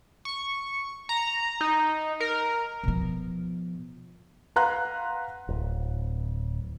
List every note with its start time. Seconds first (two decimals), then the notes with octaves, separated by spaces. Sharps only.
0.25 C#6
1.09 A#5
1.61 D#4
2.20 A#4
2.83 B2 F3
4.56 B4 F5 F#5 A#5 C6 F#6
5.48 D1